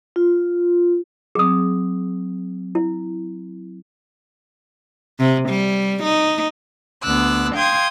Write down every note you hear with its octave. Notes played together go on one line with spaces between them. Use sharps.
F4
F#3 C4 G#4 D#6
E4
C3
G3
D#4
D2 B3 D6 E6 F#6
F5 G5 C6 D#6 G#6